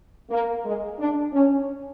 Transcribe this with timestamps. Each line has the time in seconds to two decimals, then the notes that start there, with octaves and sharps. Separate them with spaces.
0.30 A#3
0.64 G#3
0.99 D4
1.33 C#4